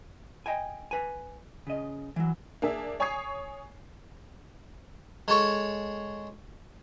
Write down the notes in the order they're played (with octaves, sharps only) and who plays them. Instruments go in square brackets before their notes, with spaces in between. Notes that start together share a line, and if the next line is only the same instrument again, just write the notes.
[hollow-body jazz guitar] D#5 G5 G#5
B4 G#5
C#3 D#5
E3 F#3
[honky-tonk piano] A#3 D4 G#4 E5
C#5 G#5 C#6 D#6 G#6 C7
[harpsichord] G#3 A4 C#5